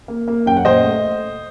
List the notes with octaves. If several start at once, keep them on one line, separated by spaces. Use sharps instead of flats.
A#3
A#3
F#2 G5
F#5
A#2 C5 D#5
A3